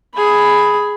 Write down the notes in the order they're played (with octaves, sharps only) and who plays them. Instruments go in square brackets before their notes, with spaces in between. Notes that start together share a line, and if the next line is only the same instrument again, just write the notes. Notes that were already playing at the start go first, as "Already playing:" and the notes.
[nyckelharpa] G#4 B5